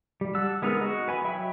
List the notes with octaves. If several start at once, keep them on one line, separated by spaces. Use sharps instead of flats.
G3
F#5 A5 E6
G#3 B3 D#4 G#4 A#4
F#4 D#5
B4 G#5 B5
F#3 E5 G5 B5